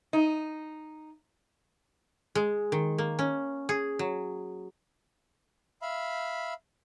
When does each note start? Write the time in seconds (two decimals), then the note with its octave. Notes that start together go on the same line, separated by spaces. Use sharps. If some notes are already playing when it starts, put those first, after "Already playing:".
0.13 D#4
2.35 G#3
2.72 D#3
2.98 A#3
3.19 C#4
3.69 G#4
3.99 F#3
5.82 E5 F5 B5